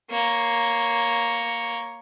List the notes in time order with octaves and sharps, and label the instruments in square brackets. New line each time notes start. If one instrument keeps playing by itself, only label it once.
[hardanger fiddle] A#3 C#5